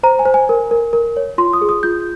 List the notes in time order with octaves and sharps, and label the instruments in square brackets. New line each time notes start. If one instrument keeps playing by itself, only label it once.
[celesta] C5 A#5
G#5
C5
G#5
A#4
A#4
A#4
C#5
F4 C6
D#6
G#4
D#6
F4 G6